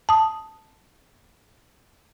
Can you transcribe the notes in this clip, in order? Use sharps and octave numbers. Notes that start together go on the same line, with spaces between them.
A5 D#6